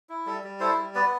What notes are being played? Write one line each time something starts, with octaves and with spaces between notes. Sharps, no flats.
E4
G3 A4
G3
E4 A4 C5
G3
B3 B4 D5